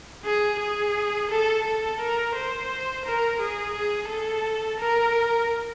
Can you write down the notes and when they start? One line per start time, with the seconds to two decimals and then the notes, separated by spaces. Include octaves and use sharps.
0.25 G#4
0.60 G#4
1.31 A4
1.64 A4
2.00 A#4
2.35 C5
3.05 A#4
3.40 G#4
3.74 G#4
4.09 A4
4.80 A#4